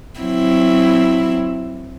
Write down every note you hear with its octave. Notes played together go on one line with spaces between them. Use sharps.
F#3 C4 E4